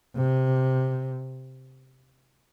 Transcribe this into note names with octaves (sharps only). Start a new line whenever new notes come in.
C3